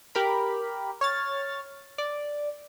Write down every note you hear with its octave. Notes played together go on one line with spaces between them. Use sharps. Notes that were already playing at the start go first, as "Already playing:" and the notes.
G4 A#4 B5
C#5 F6 A6
D5